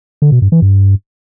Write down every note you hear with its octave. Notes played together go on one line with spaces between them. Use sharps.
D3
B2
G2
E3
G2